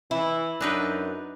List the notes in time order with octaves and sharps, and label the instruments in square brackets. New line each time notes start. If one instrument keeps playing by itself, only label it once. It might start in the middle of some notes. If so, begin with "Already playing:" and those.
[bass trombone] E3 [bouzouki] E4
[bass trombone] F#2 [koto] D4 D#4 B4